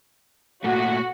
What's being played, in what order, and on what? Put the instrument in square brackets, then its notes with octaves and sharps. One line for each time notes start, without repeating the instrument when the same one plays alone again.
[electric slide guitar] A#2 A3 [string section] F#4